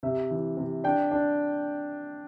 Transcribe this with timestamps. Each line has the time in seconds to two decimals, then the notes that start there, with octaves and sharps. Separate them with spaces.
0.03 C3 E5
0.31 E3
0.57 C3
0.84 D4 G5
1.11 D4